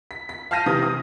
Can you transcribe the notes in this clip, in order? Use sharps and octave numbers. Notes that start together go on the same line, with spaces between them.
B6
B6
F5 A5 F6 G6 A#6 D#7
C3 E3 D#6
D#6